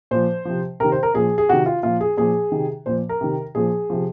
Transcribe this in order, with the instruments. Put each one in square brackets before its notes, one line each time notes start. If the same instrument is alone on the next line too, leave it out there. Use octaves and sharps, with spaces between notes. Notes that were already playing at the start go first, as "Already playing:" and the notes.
[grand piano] A#2 F3 C5
C3 F3
C3 A#4
D#3
C5
A#4
A#2 F3 G#4
G#4
C3 D#3 F#4
F4
A#2 F3 F4
G#4
A#2 F3 G#4
C3 D#3
A#2 F3 C5
A#4
C3 D#3
A#2 F3 G#4
C3 F3